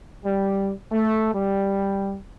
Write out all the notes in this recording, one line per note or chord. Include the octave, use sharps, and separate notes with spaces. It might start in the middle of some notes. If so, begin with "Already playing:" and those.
G3
A3
G3